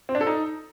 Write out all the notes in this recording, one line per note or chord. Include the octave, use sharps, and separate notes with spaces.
C4
D4
A4
D#4